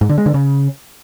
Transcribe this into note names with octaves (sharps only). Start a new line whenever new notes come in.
G#2
D3
G#3
D3
C#3